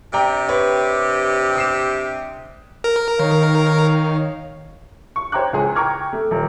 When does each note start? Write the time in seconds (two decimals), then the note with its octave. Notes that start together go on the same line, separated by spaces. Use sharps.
0.13 C3 D4 G4 D5 G5 A#5
0.49 B4 C#5
1.56 D#6 C7 E7
2.84 A#4
3.19 D#3 D#4 C#5 F5
5.16 C#6
5.32 C5 C#5 G5 A#5 D6 F#6
5.53 C#2 G#4
5.75 G5 A#5 C#6 D6 F6 G#6
6.13 A3
6.31 D#1